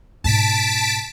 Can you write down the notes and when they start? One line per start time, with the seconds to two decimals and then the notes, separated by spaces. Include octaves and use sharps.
0.24 G#2 B2 A5 B6 D7